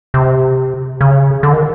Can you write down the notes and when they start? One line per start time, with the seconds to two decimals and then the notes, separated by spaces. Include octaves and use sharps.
0.14 C3
1.01 C#3
1.43 D3
1.53 D#3